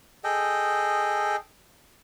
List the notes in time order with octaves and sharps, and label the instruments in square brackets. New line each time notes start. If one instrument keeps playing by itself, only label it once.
[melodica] G#4 A4 D#5 G5